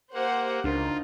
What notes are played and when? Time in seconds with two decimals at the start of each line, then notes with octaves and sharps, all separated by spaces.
0.14 A#3 G4 C5 F#5
0.64 C#2 D4 D#4 F4 A#4